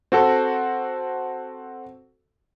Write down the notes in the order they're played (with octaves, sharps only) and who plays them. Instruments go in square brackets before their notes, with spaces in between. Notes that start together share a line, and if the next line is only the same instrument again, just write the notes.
[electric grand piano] C4 F#4 A4